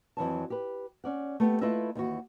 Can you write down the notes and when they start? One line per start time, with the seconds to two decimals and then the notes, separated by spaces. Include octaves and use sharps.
0.17 F2 E3 F#3 A5
0.50 G4 B4
1.04 C#4 D5 F#5
1.40 A3 B3 G4
1.61 A3 E4 F4 B4 D#5 E5
1.95 D#2 E3 F#4